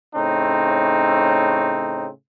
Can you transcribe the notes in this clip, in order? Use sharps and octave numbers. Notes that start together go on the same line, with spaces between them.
A2 C#3 C4 D#4